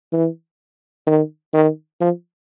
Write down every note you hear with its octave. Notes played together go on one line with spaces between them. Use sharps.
E3
D#3
D#3
F3